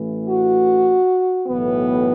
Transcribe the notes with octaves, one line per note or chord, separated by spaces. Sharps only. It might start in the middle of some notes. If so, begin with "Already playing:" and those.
Already playing: A1 A2 E3
F#4
B1 A2 E3 B3